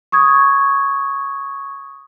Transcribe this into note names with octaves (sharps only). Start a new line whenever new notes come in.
C#6 D#6 G#6